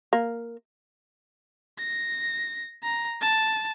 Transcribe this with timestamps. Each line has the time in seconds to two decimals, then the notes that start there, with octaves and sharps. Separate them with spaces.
0.13 A#3
1.79 A#6
2.83 A#5
3.21 A5